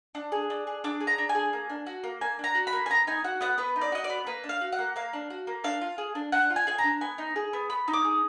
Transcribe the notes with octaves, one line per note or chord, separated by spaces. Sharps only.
D4
G#4
D4
G#4
D4 D6
G#4
A#5
D4
G#5
G#4
A#3
D4
F#4
A#3
A#3 G#5
D4 A#5
F#4
B5
A#3
G#5
B3 A#5
D#4 G#5
F#4 F#5
B3 F#5
B3 B4
D#4
D5
F#4 D#5
D5
B3
A#3 B4
D4
F5
F#4
F#5
A#3
A#3 F5
D4
F#4
A#3
D4 F5
F4
G#4
D4
D4 F#5
F4
G#5
G#4 G#5
A#5
D4
B3 G#5
D#4
G#4
B3
B3 B5
D#4
D6
G#4